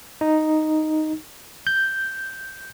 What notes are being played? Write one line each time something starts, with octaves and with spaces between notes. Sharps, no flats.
D#4
G6